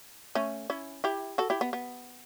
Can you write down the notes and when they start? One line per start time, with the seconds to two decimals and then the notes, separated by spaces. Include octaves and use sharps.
0.35 A3 C#4
0.70 C#4 E4
1.04 E4 G4
1.38 F#4 A4
1.50 E4 G4
1.61 B3
1.73 B3